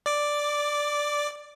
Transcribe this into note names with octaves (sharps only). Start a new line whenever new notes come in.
D5 D6